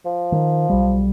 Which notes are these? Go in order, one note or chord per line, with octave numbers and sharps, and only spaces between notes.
F3
D#3
B1 G3